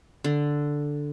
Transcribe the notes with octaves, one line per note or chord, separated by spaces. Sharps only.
D3